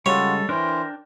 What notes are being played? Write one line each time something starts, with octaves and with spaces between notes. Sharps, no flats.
C#3 G3 G#3 F4 F#4 A4 C#5
E3 D4 A#4 C5 G5